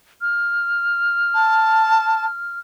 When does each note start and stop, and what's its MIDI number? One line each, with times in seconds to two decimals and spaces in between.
0.21 2.59 89
1.34 2.25 81